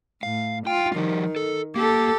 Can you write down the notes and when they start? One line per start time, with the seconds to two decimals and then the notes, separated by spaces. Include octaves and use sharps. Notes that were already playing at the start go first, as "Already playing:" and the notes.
0.23 A2 F5
0.67 F4 G5
0.96 D#3 F3 G3
1.36 A4
1.76 A#3 G4 A4